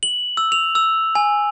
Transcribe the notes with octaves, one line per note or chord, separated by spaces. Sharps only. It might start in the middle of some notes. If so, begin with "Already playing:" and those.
F#7
E6
F7
E6
G#5